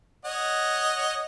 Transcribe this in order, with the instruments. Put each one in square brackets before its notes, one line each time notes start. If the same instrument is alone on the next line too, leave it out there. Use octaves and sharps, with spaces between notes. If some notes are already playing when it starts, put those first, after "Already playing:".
[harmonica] C#5 D#5 F#5